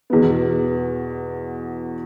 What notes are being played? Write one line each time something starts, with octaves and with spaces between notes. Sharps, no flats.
E2 B2 B3